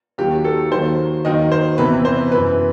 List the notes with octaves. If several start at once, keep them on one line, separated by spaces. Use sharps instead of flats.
D#2 D#3 F#3 G4
A4
D#2 D#3 F#3 C5
D#2 D#3 F#3 D#5
C5
E2 C3 E3 B4
C5
F#2 E3 B4